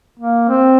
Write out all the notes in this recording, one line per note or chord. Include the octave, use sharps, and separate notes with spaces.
A#3
C4